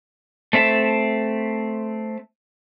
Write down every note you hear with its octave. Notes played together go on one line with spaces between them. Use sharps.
A3 C4 E5 A5